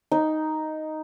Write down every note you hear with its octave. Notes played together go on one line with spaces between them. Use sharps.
D#4